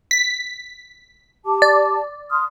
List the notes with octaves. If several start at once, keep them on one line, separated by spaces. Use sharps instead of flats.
B6
G4 A5 D6
D5
C6 D#6 F6